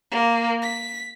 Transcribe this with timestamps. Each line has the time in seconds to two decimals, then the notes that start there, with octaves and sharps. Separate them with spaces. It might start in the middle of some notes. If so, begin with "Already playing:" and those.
0.11 A#3
0.62 B6